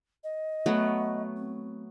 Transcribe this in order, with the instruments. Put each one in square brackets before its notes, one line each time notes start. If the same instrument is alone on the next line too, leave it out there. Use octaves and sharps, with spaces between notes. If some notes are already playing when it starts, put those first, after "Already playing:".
[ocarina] D#5
[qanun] F#3 A3 B3
[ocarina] C4